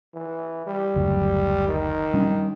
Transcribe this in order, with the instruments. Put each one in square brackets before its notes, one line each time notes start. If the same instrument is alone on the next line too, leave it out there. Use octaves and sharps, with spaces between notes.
[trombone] E3
G3
[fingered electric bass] F#1 D2 F#3
[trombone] D#3
[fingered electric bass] G3 C#4 D4